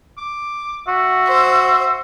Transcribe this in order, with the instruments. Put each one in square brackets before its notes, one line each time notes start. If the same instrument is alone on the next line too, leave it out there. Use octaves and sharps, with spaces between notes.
[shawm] D6
[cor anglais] F#4 [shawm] E5
[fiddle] C5